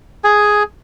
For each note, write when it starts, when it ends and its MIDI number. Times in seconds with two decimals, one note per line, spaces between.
0.24 0.63 68
0.24 0.63 80